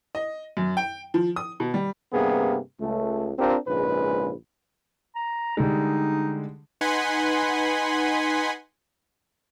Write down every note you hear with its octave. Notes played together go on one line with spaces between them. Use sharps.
D#5
F#2
G5
F3
D#6
B2
G3
G2 C3 A#3 B3 G#4
C#2 A3
C4 D4 F4 G4 A#4
A#1 G#2 C#3 G#3 B4
A#5
D3 G3 G#3 D#4
D#4 B4 F#5 G#5 B5 C6